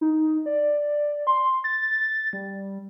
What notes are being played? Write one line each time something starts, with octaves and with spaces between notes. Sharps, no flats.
D#4
D5
C6
A6
G3